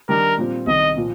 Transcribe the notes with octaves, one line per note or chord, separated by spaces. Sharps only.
D#3 G3 D4 A#4
A#2 G3 C4 F4
C2 C3 D#3 D#5
A#2 F3 A#3